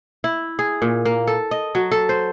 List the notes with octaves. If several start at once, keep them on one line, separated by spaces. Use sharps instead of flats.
E4
G#4
A#2
A#3
A4
D#5
F#3
A4
C5